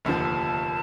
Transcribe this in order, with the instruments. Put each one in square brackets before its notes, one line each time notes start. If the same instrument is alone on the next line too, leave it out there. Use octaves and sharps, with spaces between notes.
[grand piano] F1 D#2 D3 F3 [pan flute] A5